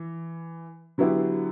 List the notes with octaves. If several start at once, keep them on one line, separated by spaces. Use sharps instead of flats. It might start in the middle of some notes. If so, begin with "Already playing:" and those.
Already playing: E3
D3 F#3 B3 E4 G4